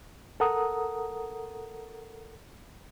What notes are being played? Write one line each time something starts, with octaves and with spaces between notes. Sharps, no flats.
A4 A#4 F#5 A#5 D#6